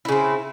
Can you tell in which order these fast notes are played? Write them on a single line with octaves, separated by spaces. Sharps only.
E4 C#3 C4